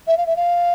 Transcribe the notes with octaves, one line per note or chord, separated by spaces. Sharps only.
E5
F5
E5
F5